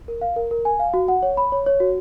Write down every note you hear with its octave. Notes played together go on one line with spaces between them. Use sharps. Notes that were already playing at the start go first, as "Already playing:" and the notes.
A#4
F5
A#4
A#4
G#5
F5
F#4
F#5
C#5
B5
C#5
C#5
F#4